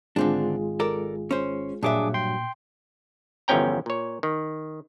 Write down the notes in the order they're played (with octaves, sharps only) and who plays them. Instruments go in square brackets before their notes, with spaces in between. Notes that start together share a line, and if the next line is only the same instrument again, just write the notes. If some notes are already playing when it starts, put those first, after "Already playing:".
[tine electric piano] G#1 [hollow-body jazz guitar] D3 C4 D4 [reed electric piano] G#3 F4 G#4
[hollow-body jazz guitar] A4 A#4 D5
C#4 C5
[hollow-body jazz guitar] G2 F#3 E5 [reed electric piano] A#2 [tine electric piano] D4 G#4 D6
[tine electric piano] G5 C6
[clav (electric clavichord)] G1 E2 F3 C#4 G5 A#5
A#2 C#5
D#3